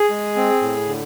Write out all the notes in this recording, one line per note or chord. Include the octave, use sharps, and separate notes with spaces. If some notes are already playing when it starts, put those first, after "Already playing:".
Already playing: G#4
G#3
C4
A2
D3